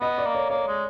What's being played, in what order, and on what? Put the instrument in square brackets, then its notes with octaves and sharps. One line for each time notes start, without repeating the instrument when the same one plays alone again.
[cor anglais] B3 [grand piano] D#5
[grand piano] D5
[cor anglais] A#3
[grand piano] C#5
[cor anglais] A#3 [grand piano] C#5
[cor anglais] G#3